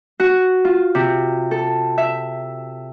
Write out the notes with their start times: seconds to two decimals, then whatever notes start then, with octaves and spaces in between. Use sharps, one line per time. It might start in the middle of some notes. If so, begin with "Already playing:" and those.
0.20 F#4
0.65 F4
0.95 C3
1.51 A4
1.98 E5